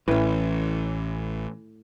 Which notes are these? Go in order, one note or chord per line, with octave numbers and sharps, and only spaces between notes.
A1 A2 E3 C#4 B4